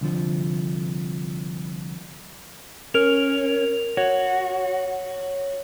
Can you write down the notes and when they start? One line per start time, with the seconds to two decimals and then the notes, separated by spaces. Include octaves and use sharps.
0.01 C2 D3 F3
2.94 C#4 A#4 F7
3.97 F#4 C#5